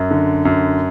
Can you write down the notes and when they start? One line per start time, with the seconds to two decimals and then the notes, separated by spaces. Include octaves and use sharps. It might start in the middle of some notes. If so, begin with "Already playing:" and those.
Already playing: F#2
0.11 D3
0.45 F#2